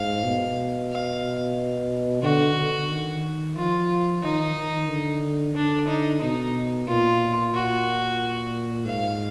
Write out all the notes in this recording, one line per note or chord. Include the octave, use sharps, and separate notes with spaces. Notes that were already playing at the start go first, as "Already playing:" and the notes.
Already playing: G#2 F5
B2
F5
D3 F#4
D3
D#3
F3 F4
D#3 D#4
D#3
D3
D3 D4
D#4
B2 D#4
A#2 F4
A#2 F#4
G#2 F5